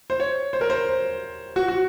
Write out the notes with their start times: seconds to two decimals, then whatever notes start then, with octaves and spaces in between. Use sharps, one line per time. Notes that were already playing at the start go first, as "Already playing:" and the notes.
0.10 C5
0.20 C#5
0.53 C5
0.61 A#4
0.70 C5
1.56 F#4
1.68 F#4